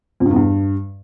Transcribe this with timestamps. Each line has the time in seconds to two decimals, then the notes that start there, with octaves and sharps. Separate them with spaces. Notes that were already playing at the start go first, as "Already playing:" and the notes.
0.20 F2
0.26 G2
0.31 E2
0.36 G2